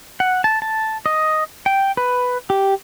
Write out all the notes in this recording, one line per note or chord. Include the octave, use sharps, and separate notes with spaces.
F#5
A5
A5
D#5
G5
B4
G4